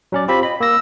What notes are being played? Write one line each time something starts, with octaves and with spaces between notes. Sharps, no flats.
F#3 C#4 D5
C4 F4 G4 B5
D#5 B5
A#3 E6 A#6